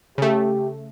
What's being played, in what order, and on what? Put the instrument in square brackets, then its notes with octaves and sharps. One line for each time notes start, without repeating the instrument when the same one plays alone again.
[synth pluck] C#3 A3 [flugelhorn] G4